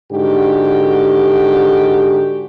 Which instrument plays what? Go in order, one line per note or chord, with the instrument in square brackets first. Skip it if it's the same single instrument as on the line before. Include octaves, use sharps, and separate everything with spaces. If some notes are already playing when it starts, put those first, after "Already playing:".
[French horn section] G#2 D3 F#4 G4